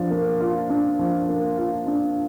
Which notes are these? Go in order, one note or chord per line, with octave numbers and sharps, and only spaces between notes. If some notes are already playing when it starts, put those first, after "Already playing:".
Already playing: F3 D4
A#3
F4
D4
F3
A#3
F4
D4